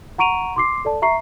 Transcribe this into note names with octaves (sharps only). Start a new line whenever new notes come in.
F#5 A#5 C#6 D7 D#7 F7
C6 D6 C7
A4 D5 A5
E5 A#5 C#6 C7